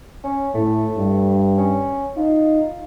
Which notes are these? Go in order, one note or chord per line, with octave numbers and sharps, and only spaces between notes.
C#4
A2 A3
G2
C#4
D#4 F4